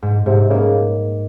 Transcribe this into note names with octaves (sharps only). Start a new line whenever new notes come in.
G#2
G#2 C3
C#3 A#3